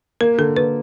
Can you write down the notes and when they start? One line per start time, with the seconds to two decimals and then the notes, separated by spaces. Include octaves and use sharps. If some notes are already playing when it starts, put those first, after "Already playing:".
0.21 A#3 A#4
0.38 D3 A4
0.57 A#3 B4